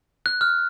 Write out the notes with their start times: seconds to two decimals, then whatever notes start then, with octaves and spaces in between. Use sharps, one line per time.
0.26 F#6
0.41 F6